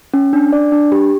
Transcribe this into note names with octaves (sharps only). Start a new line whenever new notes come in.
C#4
D4
D5
D4
G4